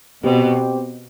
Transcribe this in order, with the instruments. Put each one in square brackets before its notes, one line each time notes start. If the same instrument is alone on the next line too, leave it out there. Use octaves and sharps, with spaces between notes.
[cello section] B2 [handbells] C4 G4 C5 G5